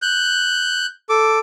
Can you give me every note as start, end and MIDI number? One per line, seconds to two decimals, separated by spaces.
0.02 0.86 90
0.02 0.86 91
1.09 1.39 69
1.09 1.39 86